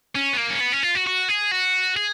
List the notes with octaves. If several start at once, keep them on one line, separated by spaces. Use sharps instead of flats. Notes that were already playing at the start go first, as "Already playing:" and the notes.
C#4
B3
A#3
C#4
B3
C#4
F4
F#4
F#4
G#4
F#4
G#4